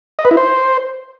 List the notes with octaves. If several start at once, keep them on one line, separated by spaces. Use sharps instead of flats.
D#5
B4
E4
C5